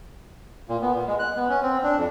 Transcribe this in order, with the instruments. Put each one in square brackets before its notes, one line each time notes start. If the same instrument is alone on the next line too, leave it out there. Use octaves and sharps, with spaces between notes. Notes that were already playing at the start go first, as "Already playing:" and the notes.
[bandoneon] A#2
B3
A#2
G#3
F#6
B3
C#4
C4
D4
F2